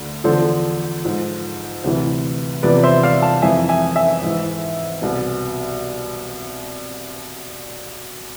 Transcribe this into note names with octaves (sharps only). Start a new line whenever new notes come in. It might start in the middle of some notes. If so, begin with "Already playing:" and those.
Already playing: D2 D3
E2 D3 F3 A4 C5
G#2 F3
D2 C3 E3
E2 C3 F3 B4 D5
C5 E5
D5 F5
F5 A5
F2 E3 E5 G#5
E5 G#5
E5 G#5
G#2 E3
C2 B2